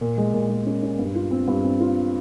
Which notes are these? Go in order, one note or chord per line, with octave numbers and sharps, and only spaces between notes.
A#2
G#3
A#2
G#3
C#4
C#4
G2
F4
C4
G2
C4
F4